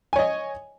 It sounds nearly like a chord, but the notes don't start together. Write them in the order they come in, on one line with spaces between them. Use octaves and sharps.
G#5 C#5 D#5